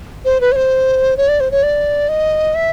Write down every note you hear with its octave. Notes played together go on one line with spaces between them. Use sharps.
C5
B4
C#5
C5
C#5
D5
C5
C#5
D5
D#5
E5